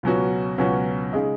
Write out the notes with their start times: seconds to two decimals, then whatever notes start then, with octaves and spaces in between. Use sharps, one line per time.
0.03 C#2 B2 F#3 C#4 F#4
0.58 C#2 B2 F#3 C#4 F#4
1.13 C#3 G#3 D#4